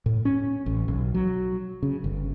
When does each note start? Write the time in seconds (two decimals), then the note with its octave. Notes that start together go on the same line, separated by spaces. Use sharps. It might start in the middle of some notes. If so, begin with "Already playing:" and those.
0.06 A2
0.25 C#4
0.66 A1
0.88 B1
1.14 F#3
1.83 C#3
2.04 G1